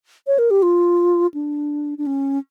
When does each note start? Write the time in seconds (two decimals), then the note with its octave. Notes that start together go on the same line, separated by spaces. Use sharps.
0.27 C#5
0.39 A#4
0.51 G4
0.62 F4
1.34 D4
1.98 D4
2.06 C#4